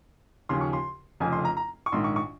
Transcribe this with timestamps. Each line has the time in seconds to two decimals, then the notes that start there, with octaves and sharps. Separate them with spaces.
0.49 D#2 C#3 F3 C6
0.61 C#6
0.73 C6
1.20 F1 F2 C#3 F3 G#5
1.33 C6
1.45 A#5
1.57 A#5
1.86 C#6
1.92 A#1 G#2 D#3 C6
2.04 C#6
2.16 C#6